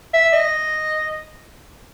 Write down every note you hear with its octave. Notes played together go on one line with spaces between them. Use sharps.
E5
D#5